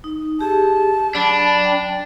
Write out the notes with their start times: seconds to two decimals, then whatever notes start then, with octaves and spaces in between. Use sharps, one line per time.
0.04 D#4
0.41 G4 G#4 A5
1.15 F#3 D4 B5
1.64 G5